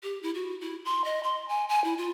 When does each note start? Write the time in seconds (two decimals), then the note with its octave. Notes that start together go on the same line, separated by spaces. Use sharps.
0.03 G4
0.23 E4
0.34 F#4
0.61 E4
0.85 C6
1.04 D#5
1.23 C6
1.49 G#5
1.69 G#5
1.84 E4
1.98 F4